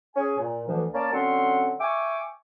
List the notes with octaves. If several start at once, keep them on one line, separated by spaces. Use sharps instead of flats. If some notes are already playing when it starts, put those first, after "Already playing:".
C#4 G#4 G#5
A#2
D2 E3 F3
A#3 C#4 D5 A5
D3 F#3 C4 C#4 F#5 C6
E5 G5 G#5 C#6 D6